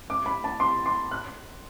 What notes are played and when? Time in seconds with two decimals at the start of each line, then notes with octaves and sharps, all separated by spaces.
0.10 D6
0.26 B5
0.44 A5
0.60 C6
0.86 C6
1.11 F#6